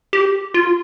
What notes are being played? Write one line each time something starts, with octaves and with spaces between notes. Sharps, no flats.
G4
F4